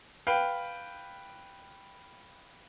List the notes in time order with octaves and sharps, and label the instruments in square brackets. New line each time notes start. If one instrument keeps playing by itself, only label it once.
[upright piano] B4 F5 G5